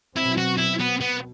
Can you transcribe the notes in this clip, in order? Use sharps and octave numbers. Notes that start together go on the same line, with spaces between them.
B2 F#3 C4 E4
F#4
E4
B3
B2 B3